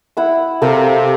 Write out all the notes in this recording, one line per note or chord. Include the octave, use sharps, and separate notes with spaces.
E4 F#5 E6
C3 A4 A#4 F5